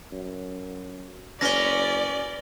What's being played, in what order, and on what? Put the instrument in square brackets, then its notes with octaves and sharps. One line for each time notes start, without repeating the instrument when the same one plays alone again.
[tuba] F#2
[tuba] F#1 [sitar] B3 C#4 [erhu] D5 [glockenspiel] A#6 G7